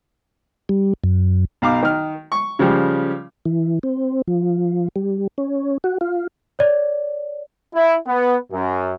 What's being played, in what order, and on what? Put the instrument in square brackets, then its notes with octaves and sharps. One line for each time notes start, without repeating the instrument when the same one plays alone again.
[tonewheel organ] G3
F#2
[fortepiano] B1 F5 D6
D#3 F6
C#6
C#3 F3 G3
[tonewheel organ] E3
C4
F3
G3
C#4
F#4
F4
[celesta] C#5 D5
[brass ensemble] E4
B3
F#2